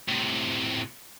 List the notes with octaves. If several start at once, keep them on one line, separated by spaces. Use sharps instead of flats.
A2 C3